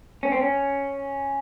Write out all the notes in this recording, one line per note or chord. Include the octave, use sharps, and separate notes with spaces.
C#4
C4
C#4